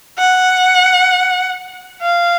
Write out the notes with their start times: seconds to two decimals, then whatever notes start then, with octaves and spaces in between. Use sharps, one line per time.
0.18 F#5
2.02 F5